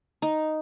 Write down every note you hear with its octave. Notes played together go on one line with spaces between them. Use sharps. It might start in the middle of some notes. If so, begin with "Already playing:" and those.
D#4